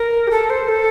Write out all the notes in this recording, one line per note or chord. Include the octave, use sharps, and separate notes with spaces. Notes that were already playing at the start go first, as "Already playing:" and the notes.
Already playing: A#4
G4
A4
C5
A4